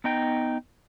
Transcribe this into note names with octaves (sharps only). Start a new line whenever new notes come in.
B3 D#4 G5